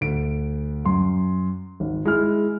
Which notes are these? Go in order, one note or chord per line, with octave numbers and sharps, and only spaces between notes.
D2 D7
F#2 C6
G#1
G#3 E4 F6